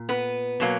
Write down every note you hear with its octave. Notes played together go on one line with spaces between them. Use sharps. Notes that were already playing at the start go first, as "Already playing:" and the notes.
Already playing: A#2
B3 B4
B2 F#3 A#3